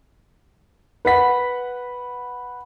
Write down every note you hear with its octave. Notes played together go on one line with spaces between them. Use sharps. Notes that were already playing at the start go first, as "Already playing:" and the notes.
B4 F#5 B6